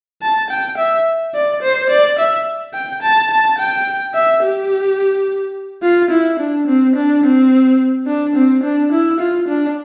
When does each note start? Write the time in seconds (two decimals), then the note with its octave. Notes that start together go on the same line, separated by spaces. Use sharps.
0.22 A5
0.50 G5
0.78 E5
1.35 D5
1.63 C5
1.90 D5
2.19 E5
2.74 G5
3.03 A5
3.31 A5
3.59 G5
4.15 E5
4.43 G4
5.83 F4
6.11 E4
6.40 D4
6.67 C4
6.96 D4
7.24 C4
8.07 D4
8.36 C4
8.63 D4
8.92 E4
9.20 F4
9.48 D4